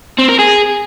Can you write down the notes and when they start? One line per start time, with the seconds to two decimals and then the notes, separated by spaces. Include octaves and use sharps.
0.19 C4
0.29 A#4
0.39 G#4